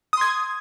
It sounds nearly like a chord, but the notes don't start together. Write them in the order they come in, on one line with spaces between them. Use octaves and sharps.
D#6 C6 G#6